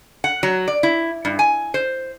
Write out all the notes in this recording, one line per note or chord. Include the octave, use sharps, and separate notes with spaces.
F#5
F#3
D5
E4
G2
G#5
C5